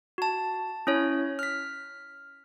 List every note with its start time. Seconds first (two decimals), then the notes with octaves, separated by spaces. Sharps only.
0.18 F#4 A5
0.87 C#4 E4 C#5
1.39 F6 B6